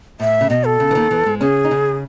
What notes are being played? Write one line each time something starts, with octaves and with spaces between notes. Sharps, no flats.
A2 E5
C#3
B2 D#5
A4
C#3
E3
D#2 D#3
E2 E3
G#2 G#3
C#3 C#4 G#4
D#4
C#3 C#4